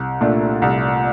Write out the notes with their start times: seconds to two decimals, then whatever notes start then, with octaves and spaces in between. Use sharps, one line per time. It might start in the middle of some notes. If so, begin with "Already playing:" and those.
Already playing: C2
0.21 A#2 A3 D4
0.62 C2